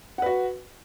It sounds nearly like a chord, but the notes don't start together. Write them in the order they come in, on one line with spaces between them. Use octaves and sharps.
F#5 B4 F#4